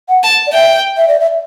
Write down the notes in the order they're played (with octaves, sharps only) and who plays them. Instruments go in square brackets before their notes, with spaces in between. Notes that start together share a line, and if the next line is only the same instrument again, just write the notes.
[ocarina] F#5
[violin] A5
[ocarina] D5
[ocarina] E5 [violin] G5
[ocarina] E5
D5
E5